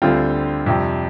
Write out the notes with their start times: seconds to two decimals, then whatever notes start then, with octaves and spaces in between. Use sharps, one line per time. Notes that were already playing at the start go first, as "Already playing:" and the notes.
0.02 D2 D3 G3 C4 F4
0.66 F2 C3 G3